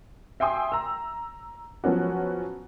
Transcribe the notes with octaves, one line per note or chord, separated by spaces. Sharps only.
E5 G5 G#5 C6 D#6
A#5 E6
F3 F#3 B3 C#4 F#4